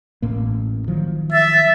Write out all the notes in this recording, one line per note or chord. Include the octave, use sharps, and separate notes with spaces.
A1 A2 A#3
D#3 F3 F#3
E5 A6